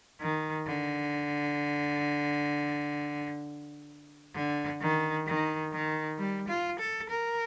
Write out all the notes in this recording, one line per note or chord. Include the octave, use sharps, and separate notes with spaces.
D#3
D3
D3
D#3
D#3
D#3
G3
F4
A4
A#4